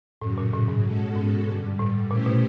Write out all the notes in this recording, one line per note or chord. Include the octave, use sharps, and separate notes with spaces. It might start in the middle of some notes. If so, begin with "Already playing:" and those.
F#2 A2 C#3 F#3
A#2
A2
G#2
B2 G#3 C#4 F#4 A4
G#2
G2 D3 G3
A2
A#2 A3 C#4 E4 G4 C5
B2